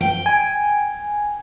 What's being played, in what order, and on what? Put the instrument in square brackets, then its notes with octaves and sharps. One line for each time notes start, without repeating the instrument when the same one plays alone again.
[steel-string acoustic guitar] G5
[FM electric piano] G#5